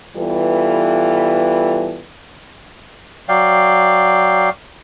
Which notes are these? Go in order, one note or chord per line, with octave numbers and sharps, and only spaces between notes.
E3 G3 B3 F4 A4 B4
F#3 D5 F5 G5